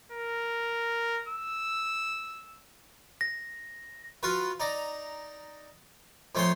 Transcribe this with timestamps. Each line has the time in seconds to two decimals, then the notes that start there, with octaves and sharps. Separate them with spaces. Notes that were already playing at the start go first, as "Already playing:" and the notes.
0.12 A#4
1.28 E6
3.21 A#6
4.23 F4 F#4 B4
4.60 D#4 D5 A#5
6.35 F2 A3 C5 C#5 G#5 C6